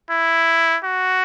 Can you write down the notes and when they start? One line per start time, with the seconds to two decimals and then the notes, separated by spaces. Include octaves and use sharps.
0.10 E4
0.84 F#4